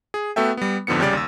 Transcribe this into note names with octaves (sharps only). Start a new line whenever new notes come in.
G#4
A3 B3 F#4 A4 E5 G5
G3 B3
F2 G#2 D3 F3 B3 C#7
C2 C#3 G3 G4 D5 A6
D#2 E6